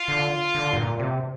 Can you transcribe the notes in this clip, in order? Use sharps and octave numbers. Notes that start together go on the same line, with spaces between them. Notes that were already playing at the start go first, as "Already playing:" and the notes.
Already playing: F4
D3
D3
G2
A#2
C3